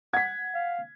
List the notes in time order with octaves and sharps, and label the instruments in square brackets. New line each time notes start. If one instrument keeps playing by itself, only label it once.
[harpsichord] F#5 [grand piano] G#6 B6
[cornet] F5